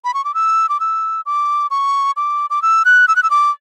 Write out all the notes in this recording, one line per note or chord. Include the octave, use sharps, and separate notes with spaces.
B5
C#6
D6
E6
D6
E6
D6
C#6
D6
D6
E6
F#6
E6
F#6
E6
D6